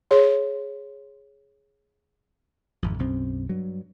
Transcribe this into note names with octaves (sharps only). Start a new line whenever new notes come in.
G#4 C#5 C6
G#1 F2
B1 F#2 C4
G2 F#3